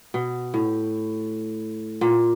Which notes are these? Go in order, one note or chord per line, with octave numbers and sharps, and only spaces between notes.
B2
A2
A#2